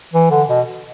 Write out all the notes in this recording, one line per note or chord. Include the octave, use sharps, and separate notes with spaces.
E3
D3
B2